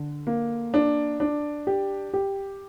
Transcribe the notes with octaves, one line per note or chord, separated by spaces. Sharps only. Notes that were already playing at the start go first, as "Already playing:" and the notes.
Already playing: D3
A#3
D4
D4
G4
G4